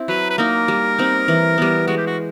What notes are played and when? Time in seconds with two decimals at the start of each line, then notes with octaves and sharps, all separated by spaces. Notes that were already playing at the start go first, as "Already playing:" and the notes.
Already playing: C4 E4
0.08 F#3 B4
0.30 B4
0.38 A#3 D#4 A#4
0.68 G3
0.98 C4 D#4
1.28 E3
1.58 G3 B3
1.87 G#3 F#4
1.97 G4
2.07 F#4